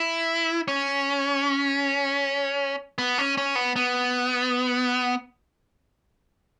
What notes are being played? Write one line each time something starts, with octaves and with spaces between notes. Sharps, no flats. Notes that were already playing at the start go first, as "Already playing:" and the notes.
Already playing: E4
C#4
B3
C#4
C#4
B3
B3